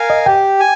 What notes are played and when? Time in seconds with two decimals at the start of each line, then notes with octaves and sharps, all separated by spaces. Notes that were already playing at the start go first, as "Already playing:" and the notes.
Already playing: A#4 F5 G#5
0.10 D#5
0.26 G4 G5
0.60 G#5